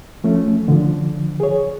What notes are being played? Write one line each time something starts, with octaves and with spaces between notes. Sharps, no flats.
F3 A3 C#4
D3 F3
G#4 C#5